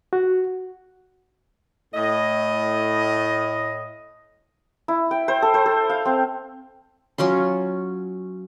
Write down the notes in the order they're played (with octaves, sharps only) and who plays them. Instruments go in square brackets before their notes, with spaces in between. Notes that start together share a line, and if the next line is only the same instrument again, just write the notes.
[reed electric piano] F#4
[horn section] A2 D#5
[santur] E4
G5
C5
A4
C5
A4
F5
C4
[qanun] F#3 C#4 F4 C6